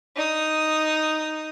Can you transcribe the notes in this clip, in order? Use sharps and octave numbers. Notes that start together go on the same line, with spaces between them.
D#4 D#6